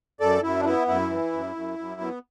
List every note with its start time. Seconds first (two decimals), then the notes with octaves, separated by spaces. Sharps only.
0.20 F#2 A4 D5
0.43 F#2 E4
0.59 D4
0.65 B3 E4
0.88 F#2 E4
1.10 E3
1.32 F#2
1.56 F#2
1.79 F#2
2.01 B3